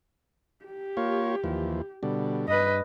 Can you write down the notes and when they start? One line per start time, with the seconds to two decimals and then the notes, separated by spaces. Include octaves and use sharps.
0.65 G4
0.97 A#3 F4 C#5
1.44 D#2 E3 F3
2.03 B2 D3 G3
2.48 G2 B4 D#5